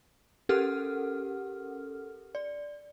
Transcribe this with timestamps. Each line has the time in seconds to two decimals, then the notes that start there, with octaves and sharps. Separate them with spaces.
0.49 C#4 G4 A4 A#4 F#5 F6
2.35 D5